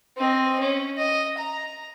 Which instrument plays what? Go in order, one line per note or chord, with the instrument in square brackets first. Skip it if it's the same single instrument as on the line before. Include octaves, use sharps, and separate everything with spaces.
[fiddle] C4 D#5
C#4
D#5
A#5